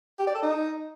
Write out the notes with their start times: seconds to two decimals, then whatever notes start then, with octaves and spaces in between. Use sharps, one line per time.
0.19 G4
0.27 D5
0.35 A4
0.43 D#4